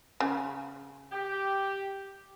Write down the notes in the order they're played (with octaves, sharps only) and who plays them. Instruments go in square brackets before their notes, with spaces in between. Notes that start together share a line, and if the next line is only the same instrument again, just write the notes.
[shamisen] C#3
[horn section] G4